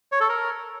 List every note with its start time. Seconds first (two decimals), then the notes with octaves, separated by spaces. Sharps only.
0.12 C#5
0.21 A4
0.29 A#4